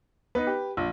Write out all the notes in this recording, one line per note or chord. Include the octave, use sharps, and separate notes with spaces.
B3 D#4 B4
G4
A#1